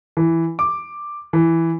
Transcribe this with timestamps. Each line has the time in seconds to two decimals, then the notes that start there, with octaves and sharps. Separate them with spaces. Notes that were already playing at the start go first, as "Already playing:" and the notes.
0.17 E3
0.59 D6
1.33 E3